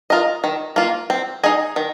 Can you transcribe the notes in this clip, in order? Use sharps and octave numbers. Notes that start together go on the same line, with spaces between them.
F4 A#4 D#5
D#3
A#3 F4
C4
D#4 G#4 D#5
D#3